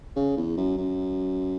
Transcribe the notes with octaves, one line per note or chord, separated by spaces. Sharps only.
C#3
E2
F#2
F#2